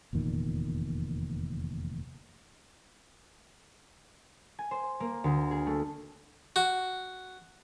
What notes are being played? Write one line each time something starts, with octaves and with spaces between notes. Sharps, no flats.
F1 E2 A#2 D#3
G#5
C5
A#3
D2
G#4
A3
F#4